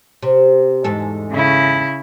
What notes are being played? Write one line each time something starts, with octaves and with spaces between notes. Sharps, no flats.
C3
E2 G#2 A4
C#3 E4